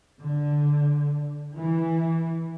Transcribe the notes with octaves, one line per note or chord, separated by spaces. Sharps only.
D3
E3